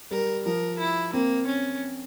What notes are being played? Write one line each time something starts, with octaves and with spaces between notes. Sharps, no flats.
G3 A#4
F3 A#4
E4
A#3 C4
C#4